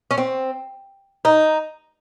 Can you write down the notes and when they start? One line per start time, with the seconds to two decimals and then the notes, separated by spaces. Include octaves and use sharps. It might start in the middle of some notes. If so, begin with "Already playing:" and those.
0.11 C#4
0.18 C4
1.25 D#4